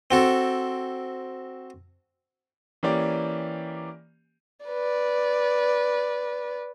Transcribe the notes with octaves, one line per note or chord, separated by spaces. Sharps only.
C4 F#4 A4
E3 A#3 C#4 G4 D5
B4 D5